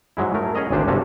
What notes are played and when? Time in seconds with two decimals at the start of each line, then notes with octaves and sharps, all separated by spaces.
0.17 G#2 F#3 G#3 E4
0.34 A3 A#4
0.55 C#4 G#4 C#5 D#5 A#5
0.71 G#1 D2 C#4 D4 C5
0.88 G1 C3 C#4 F#4 F5 A5